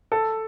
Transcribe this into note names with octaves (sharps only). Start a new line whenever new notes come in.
A4